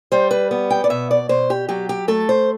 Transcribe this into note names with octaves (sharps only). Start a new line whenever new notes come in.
G3 C5
B4
B3
G5
D5
B2 E5
D5
B2 C5
G4
F#3 G4
G4
A3 A4
C5